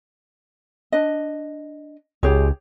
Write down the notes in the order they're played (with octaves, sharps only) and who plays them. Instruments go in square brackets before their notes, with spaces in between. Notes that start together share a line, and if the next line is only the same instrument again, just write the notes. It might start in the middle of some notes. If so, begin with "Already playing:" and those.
[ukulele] D4 D#5
[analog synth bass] C#2 [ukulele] G4 G#4 C#5